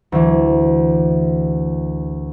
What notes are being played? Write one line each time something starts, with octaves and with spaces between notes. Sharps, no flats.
D2 E3